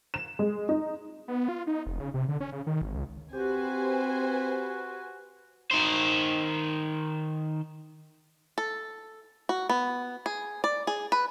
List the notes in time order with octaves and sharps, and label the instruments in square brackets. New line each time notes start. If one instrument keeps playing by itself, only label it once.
[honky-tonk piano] E7
G#3
D#4
[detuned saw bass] B3
F4
D#4
F1
C#3
C3
D3
C#4
C#3
D#3
G#1
C#2
[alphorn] C4 [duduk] F#4 [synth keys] G4 [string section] B4 C5 G#5
[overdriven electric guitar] D#3 C5
[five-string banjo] A4
F#4
B3
G#4
D5
G#4
B4